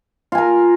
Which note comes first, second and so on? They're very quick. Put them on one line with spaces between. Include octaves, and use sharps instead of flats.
F4 G#5 A#4